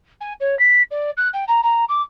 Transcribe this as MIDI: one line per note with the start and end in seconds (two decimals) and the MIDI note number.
0.21 0.33 80
0.40 0.57 73
0.59 0.82 95
0.91 1.11 74
1.17 1.29 90
1.34 1.44 79
1.48 1.61 82
1.63 1.85 82
1.89 2.02 86